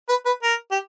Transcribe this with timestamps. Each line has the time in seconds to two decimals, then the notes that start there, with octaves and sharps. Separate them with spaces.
0.09 B4
0.26 B4
0.43 A#4
0.71 G4